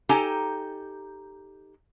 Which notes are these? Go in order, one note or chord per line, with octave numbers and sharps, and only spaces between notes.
D#4 G4 A4 G5 G#5 A#5